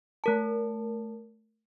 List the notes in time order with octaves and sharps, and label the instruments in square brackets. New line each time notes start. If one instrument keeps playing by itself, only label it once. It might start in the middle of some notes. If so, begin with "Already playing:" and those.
[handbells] A3 A#4 A5